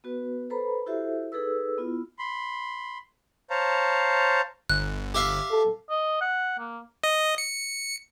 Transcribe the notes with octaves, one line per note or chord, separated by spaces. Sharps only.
B3 F#4 B4
A4 B4 C5 A#5 B5
E4 F#4 G4 A4 C5 E5
D#4 G#4 A4 B4 E6
B3 E4 F4
B5 C6
C5 C#5 F5 A5 A#5
G1 F#6
G4 E5 F5
A4
D#5
F#5
A#3
D#5
C#7